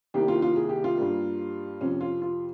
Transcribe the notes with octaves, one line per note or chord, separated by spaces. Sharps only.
C2 C3 D#3 G3 A#3 G4
F4
F4
G#4
G4
F4
G2 G3 A#3
F2 C3 F3 C#4
F4
F4